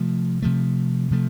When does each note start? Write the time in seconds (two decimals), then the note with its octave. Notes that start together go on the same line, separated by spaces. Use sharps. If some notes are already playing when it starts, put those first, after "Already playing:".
Already playing: C3 F3 A3
0.42 C3 F3 A3
1.11 C3 F3 A3